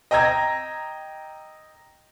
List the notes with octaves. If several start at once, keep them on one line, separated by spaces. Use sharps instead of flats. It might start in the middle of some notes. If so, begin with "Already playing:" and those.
D#5 G5 A#5 E6 G#6 A#6